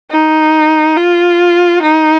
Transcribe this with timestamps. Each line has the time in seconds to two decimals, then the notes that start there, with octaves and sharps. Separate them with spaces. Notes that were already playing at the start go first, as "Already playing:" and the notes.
0.11 D#4
0.97 F4
1.82 D#4